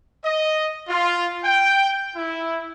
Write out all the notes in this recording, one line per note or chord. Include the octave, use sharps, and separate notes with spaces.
D#5
F4
G5
E4